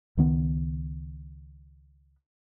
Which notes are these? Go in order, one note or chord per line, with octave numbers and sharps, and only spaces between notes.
C#2 D#3 B3